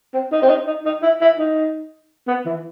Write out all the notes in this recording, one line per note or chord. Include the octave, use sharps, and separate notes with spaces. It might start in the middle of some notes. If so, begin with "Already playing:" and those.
C4
D#4
C4
D#4
D#4
D#4
E4
E4
D#4
B3
E3